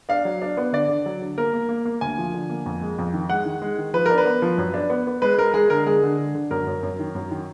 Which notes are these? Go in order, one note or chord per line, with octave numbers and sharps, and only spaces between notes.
D4 F5
F#3
D4
B3
D3 D5
D3
F#3
D3
A#3 A#4
A#3
A#3
A#3
D2 G#5
F3
D3
A#3
F2
G#3
F2
D#3
G#3 F#5
D#3
G#3
D#3
F3 B4
D4 A#4
B4
B3
F3
F#2
D4
B3
B3
G#3 B4
G#3 A#4
G#3 G#4
D3 A#4
G#3 G#4
D3
D3
D3
F#2 A#4
F#2
F#2
D#3
F#2
D#3